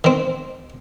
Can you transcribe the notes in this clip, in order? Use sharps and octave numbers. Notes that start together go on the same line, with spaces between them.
D#3 C4